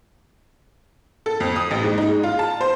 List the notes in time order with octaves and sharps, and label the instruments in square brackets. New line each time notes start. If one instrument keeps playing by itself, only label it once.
[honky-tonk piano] A4
F2
D#6
A1
G#2
D#4
G#3
F4
A5
C5